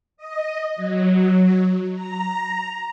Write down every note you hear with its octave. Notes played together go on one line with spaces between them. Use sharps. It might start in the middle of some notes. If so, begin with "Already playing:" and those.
D#5
F#3
A#5